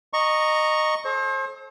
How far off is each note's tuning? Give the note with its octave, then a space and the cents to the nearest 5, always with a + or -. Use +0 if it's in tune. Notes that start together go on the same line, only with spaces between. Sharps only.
D#5 -15 A#5 +0 C#6 +0
A4 -35 C5 +35